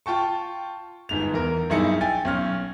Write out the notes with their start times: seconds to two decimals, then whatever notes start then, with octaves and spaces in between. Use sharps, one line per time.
0.06 F4 G5 A5 C#6
1.09 G1 G#2 F7
1.34 E2 A#4
1.70 B1 G2 D#4 E4 G#4 C#7
2.01 G5 G#5 A6
2.25 B1 C#4 F6